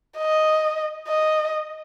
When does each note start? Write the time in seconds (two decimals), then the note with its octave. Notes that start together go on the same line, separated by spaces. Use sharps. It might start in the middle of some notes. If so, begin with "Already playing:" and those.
0.17 D#5
1.08 D#5